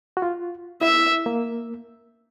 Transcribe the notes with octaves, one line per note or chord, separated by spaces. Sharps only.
F#4
F4
E4 E5
A#3